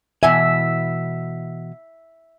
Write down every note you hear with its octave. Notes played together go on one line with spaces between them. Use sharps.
B2 E3 E5 G#5